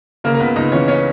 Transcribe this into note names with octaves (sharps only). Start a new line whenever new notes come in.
C#3 A#3 A#4
A#4
C#2 B3 B4
C#2 D#4 D#5
E3 C#4 C#5
C#4 C#5